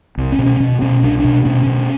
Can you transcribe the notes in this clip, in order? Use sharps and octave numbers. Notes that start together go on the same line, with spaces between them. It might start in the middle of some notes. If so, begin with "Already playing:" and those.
C2
C#4
B2
C#4
B2
B2 C#4
C2 D4
B2 D4
B2 C#4
B2